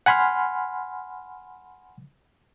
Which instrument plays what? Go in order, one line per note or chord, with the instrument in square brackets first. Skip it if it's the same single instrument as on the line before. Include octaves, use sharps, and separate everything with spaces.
[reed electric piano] F#5 G#5 B5 C6 F6